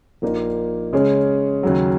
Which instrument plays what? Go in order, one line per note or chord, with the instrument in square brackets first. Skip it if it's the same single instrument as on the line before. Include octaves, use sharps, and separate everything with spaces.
[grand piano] A#1 A#2 A#3 D#4
C#3 G#3 C#4 G#4 C#5
D#2 C#3 F#3